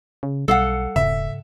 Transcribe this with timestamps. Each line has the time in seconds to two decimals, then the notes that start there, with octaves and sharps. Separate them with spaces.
0.23 C#3
0.48 B1 G3 A4 F5 F#5
0.96 E1 G#2 C#3 E5